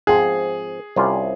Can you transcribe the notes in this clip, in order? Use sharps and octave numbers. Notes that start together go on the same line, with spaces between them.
G#2 F3 C4 G#4
C2 C3 G3 C#4 F4